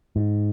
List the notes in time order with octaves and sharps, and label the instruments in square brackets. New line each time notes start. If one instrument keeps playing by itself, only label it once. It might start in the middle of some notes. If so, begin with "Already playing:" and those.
[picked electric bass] G#2